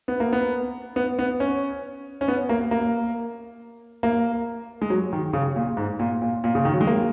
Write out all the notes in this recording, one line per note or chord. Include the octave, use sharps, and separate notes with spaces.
B3
A#3
B3
B3
B3
C#4
C#4
B3
A#3
A#3
A#3
G#3
F#3
D#3
C#3
A#2
G#2
A#2
A#2
A#2
C#3
D#3
F#3
G#3
A#3